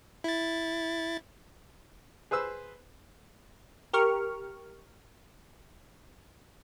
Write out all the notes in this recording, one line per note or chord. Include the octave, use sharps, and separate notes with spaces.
E4 A6
G#4 B4 C5 E6
G4 A#4 C#6 F6